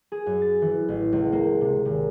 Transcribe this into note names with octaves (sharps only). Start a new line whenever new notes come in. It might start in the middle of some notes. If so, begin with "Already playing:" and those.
G#4
F#2
A6
E3
A1
C#2
A#3
C3
G#1